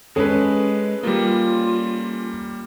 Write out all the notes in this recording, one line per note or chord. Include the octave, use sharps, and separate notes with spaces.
G#3 C#4 G#4 A4 B4
G3 A#3 F4